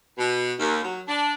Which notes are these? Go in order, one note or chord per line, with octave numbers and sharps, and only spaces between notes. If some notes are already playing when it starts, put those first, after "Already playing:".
B2
D#2
F#3
D4